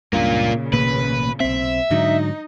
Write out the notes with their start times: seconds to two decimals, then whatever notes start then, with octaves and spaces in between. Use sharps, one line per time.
0.13 C#2 G2 A#2 C#3 A#3 F4
0.73 A1 B2 A#3 B4
1.40 B1 C4 E5
1.91 G#2 D3 F#3 D#4